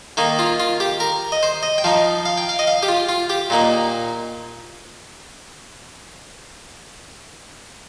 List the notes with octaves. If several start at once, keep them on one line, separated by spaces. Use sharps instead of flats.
D#3 A#3 D#4
F4
F4
G4
A#4
D#5
C5
D#5
G5
F3 D#4 F5
F5
G5
F5
D#5
F5
G4
F4
F4
G4
A#2 A#3 D#4